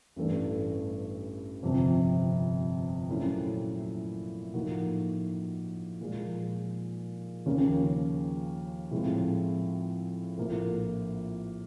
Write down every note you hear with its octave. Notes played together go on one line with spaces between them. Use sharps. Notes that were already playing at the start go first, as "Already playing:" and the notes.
A1 G2 E3 A3 D4
G1 F2 C3
A#2 F#3 A3 C#4 E4
A2 F3 A#3 D#4 F#4
A#2 F3 G#3
D#2 C#3 F3 A#3 C#4
A2 F3 G#3 C4
A#1 A2 F3 A#3